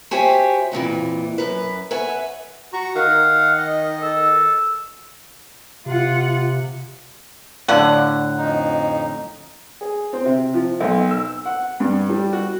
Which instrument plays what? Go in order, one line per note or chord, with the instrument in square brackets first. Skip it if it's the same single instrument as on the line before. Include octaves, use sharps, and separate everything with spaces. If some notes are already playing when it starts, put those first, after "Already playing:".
[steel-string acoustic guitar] F#4 G4 C5 C#5 E5 G#5
F2 A#2 D#3 E3
F#2 B4
B4 C#5 E5 F#5 G#5
[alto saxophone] F#4 [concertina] A#5 C#6
[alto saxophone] D#3 [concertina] F5 F#5
[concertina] D#5
[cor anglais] A4
[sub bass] C3 [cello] F4 F#5
[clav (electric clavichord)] A2 D3 [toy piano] D5 F5 [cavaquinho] F#5
[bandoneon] F2 D#4
[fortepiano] G#4
C4
C3
F3
B1
E6
F#5
G2
G3
F#4